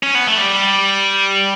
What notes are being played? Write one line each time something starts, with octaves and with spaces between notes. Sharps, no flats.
C#4
B3
A3
G3